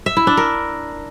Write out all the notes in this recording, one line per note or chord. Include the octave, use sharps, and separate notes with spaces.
E5
E4
D4
A#4